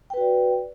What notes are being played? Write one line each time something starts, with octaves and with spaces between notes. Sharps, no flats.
F#4 B4 D5 G5